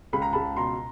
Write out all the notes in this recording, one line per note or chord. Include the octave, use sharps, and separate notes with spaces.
C#2 B5
A#5
C#2 A5 B5
B2 A#5 C6